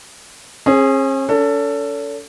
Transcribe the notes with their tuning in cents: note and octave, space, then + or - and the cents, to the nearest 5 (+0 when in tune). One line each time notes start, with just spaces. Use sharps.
C#4 -45 G#4 -5
C#4 +45 A4 +20